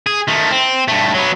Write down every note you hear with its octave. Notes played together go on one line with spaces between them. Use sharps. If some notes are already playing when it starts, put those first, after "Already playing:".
G#4
D#3 A3
C4
G2 A3
F#3 B3